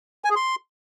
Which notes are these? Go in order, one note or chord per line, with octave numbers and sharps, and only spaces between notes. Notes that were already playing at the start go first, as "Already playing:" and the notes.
G#5
G#4
C6